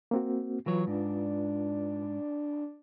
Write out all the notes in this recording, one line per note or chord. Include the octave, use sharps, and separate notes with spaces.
A#3 C4 F#4
E3 F#3 F4 B4 C#5
G#2 D4